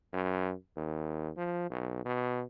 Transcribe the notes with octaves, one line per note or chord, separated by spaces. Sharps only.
F#2
D#2
F3
B1
B2